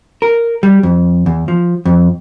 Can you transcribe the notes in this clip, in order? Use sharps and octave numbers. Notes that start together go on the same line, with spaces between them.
A#4
G3
F2
E2
F3
F2